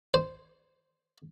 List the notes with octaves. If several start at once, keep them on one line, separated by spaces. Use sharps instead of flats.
C5